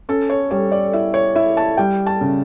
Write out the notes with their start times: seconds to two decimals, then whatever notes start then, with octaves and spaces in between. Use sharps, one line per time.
0.09 C#4 A4
0.30 C#5
0.51 G3 C#5
0.72 D5
0.93 E4 E5
1.14 C#5
1.36 E4 E5
1.57 A5
1.77 G3 G5
2.07 A5
2.21 C#3